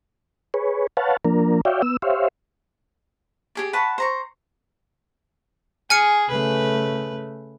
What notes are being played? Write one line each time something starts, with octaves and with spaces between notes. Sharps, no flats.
G#4 B4 C#5
B4 C#5 F5 F#5 A5
F3 A#3 D4 A#4
F#4 C#5 D5 E5 F5 G5
B3 E6
G4 C5 C#5 E5 F5
G4 G#4 D5
B4 F#5 A5 C#6
C5 A#5 C#6
G#4 G#5 F6 C#7
C#3 A3 B4